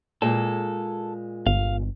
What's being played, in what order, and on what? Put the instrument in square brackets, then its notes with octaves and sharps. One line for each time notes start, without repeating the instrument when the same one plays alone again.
[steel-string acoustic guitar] A#2 G#3 [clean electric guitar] A4
[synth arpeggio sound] G1 [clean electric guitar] F5